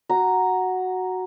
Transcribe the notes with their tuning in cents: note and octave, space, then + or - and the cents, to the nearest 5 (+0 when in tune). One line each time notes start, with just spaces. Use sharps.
F#4 +0 A#5 +0